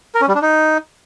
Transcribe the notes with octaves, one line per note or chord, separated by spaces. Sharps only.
A#4
C#4
G3
D4
D#4